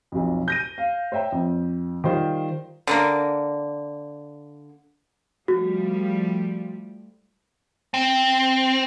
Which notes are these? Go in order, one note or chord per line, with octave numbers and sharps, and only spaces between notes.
B1 F2
G6 A#6 D#7
F5
C5 C#5 E5 G5 A#5
F2
D#3 G3 F4 C5
D3 A#3
F3 G3 A3 F#4
C4